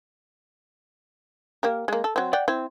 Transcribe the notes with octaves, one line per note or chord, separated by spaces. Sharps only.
A#3 G4 A#4
G#3 A#3
A4
F#3 C4
D5 F#5 G5
C4 E4